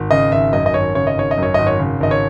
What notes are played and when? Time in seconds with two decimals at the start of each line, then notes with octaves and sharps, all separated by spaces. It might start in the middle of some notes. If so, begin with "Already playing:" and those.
Already playing: G#1
0.11 C#3 D#5
0.32 G#1 E5
0.53 F#2 D#5
0.66 D#5
0.74 G#1 C#5
0.95 C#3 C#5
1.07 D#5
1.17 G#1 C#5
1.31 D#5
1.38 F#2
1.43 C#5
1.54 G#1 D#5
1.67 C#5
1.79 C#3
2.00 G#1 D#5
2.11 C#5